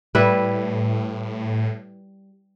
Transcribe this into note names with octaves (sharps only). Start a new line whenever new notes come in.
A2 G3 E4 B4